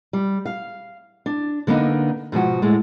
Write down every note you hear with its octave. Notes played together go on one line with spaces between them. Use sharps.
G3
F5
D4
D3 A#3 B3 D4 D#4
G#2 B2 F3 F#4
A2 G#3 A3